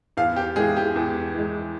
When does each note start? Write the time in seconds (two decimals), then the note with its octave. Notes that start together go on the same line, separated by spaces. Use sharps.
0.17 E2 F5
0.36 G4
0.56 E3 G#3 G#4
0.77 G4
0.96 E2
1.34 E3 G#3